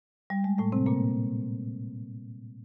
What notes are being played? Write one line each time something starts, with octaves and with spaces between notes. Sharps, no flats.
G3
G#3
A2 A3
C3 C4
A#2 A#3